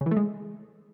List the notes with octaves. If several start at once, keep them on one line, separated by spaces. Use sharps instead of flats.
C#3
E3
A3
G#3